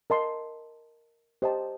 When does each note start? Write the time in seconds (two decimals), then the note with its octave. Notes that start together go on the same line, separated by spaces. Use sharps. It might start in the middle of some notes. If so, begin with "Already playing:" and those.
0.10 A#4 D#5 A5 C6
1.42 G4 C5 D#5 A5